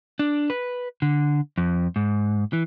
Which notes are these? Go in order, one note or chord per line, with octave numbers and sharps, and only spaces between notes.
D4
B4
D3
F2
G#2
E3